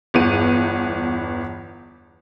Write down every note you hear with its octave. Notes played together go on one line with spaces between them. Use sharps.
G1 E2 B3 D#7